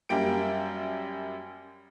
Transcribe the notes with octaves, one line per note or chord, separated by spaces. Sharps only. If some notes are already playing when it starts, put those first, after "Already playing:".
F#2 G3 A#3 G4 D7